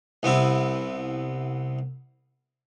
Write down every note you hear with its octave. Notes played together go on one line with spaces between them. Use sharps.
C2 B3 C4 E4